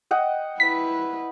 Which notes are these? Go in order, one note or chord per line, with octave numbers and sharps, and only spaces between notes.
D#5 F#5 G5
E4 B4 B6